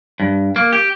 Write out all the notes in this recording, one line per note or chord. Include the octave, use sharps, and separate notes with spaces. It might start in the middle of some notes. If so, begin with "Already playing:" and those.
G2
A#3
G4